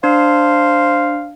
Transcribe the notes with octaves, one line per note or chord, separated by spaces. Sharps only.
D4 C5 F5